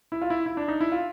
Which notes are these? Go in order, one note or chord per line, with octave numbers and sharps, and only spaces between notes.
E4
F4
E4
E4
D4
D#4
E4
F4